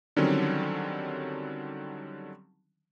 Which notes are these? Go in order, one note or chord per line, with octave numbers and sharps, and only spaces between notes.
D3 D#3 F#3 G3 C4 C#4